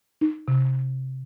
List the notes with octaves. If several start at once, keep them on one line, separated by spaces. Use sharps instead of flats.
D#4
C3